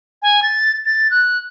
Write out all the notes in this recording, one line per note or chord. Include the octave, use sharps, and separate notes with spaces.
G#5
A6
A6
F#6